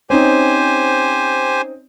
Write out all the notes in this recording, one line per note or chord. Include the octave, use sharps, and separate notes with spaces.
C4 C#4 D#4 G4 C5 G#5